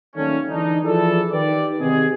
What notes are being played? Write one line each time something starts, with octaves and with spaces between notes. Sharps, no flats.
D#3 F#3 G3 A3 A#3 C#4
D3 E3 G#3 D4 D#4
E3 F3 D4 E4 G#4 A4
D#3 G4 B4 D5
C3 D#3 G#3 B3 G4 G#4